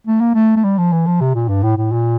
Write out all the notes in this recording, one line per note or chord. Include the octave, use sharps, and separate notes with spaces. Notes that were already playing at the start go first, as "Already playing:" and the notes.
A3
A#3
A3
A3
G3
F3
E3
F3
C3
A#2
G2
A2
A2
A#2